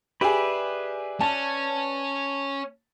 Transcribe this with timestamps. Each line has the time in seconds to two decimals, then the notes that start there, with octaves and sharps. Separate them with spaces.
0.21 G4 G#4 B4 D5 E5
1.21 C#4 A5